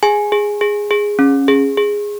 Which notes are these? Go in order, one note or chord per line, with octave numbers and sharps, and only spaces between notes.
G#4 G#5
G#4
G#4
G#4
C#4
G#4
G#4